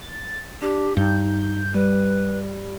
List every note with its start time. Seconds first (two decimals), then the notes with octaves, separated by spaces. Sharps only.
0.01 A6
0.62 D4 G4
0.97 G2 D#4 G6
1.74 G3 B4